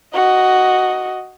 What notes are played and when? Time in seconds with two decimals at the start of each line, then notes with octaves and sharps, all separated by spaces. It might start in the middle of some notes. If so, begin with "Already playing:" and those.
0.14 F#4 D#5